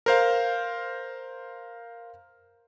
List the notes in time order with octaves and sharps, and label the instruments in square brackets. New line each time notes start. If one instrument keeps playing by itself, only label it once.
[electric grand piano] A#4 C5 F5